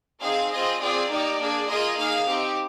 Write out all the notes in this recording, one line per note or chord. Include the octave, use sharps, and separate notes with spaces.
C4 D#4 G#4 F5
C4 F4 G#4 D#5
C4 F4 G#4 D5
A#3 D#4 G4
A#3 D4 G#4
A#3 F4 G#4 D#5
A#3 D#4 G#4 F5
C4 D#4 G4